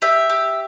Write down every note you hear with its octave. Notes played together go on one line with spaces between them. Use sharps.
G4 E5
G4